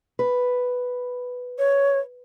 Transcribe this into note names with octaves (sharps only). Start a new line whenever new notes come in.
B4
C#5